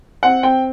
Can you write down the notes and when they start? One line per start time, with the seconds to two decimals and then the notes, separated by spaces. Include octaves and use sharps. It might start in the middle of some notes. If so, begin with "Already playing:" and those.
0.23 C4 F#5
0.43 C4 G5